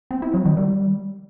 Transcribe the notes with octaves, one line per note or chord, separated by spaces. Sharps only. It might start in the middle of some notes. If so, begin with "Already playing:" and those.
C4
E4
F#3
D#3
G3